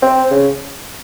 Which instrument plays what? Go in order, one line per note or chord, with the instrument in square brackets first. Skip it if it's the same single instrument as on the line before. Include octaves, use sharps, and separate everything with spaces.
[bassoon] C4
C#3